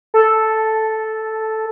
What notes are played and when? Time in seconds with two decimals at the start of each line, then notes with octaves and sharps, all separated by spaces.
0.14 A4